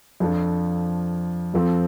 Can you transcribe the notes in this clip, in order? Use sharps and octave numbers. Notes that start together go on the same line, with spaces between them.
F2 F3 D4 A4
F2 F3 C4 A4